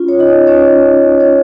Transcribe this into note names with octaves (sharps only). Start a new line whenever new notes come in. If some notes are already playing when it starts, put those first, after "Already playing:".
Already playing: C#4 F4
C#5
D#4 D#5
C#4 C#5
C#5